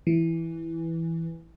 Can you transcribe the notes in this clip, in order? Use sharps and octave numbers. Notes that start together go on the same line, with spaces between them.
E3